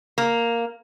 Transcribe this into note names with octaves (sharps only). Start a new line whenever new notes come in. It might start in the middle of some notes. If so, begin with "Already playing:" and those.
A#3